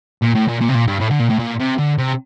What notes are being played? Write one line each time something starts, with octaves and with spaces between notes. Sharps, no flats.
A#2
A2
A#2
A#2
C3
A#2
G2
A2
D3
A#2
A2
A#2
C3
D3
C3